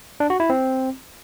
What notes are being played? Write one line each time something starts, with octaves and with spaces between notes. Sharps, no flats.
D4
F#4
E4
C4